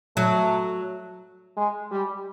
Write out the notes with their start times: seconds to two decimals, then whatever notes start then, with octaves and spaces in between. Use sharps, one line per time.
0.16 F#3 A3
1.57 G#3
1.91 G3